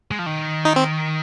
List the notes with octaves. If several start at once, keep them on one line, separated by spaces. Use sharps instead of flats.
G#3
F3
D#3
D#4
C4